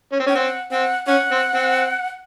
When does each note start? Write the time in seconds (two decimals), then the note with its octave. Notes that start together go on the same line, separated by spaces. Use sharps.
0.12 C#4
0.20 C4
0.26 C#4 G5
0.35 C4 F#5
0.71 C4 F#5
1.07 C#4 F#5
1.32 C4
1.54 C4